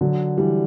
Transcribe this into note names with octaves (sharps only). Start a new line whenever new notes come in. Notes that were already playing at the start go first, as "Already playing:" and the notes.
D3 F#3
E3 G3